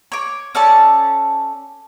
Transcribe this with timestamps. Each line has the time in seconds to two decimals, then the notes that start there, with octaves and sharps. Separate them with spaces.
0.12 C#5 D6
0.55 C#4 A4 D5 A5